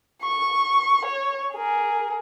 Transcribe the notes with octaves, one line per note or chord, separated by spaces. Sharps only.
C#6
C#5
G#4 A#4